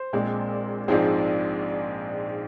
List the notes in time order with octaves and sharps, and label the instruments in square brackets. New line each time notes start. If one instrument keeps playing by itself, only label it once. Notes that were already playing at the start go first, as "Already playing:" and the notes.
Already playing: [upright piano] C5
A#1 A#2 G#3 C4
A#1 G#2 F3 C4 G#4